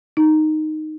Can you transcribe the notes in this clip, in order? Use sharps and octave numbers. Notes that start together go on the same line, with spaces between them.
D#4